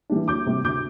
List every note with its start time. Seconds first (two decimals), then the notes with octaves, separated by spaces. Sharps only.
0.10 E3 G3 D4
0.28 D2 D6 G6
0.46 C3 G3
0.64 D2 D6 G6